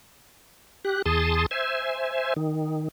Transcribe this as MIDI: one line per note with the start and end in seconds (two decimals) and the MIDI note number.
0.85 1.02 67
0.85 1.02 90
1.06 1.46 40
1.06 1.46 68
1.06 1.46 81
1.06 1.46 84
1.06 1.46 87
1.51 2.34 72
1.51 2.34 76
1.51 2.34 80
2.36 2.88 51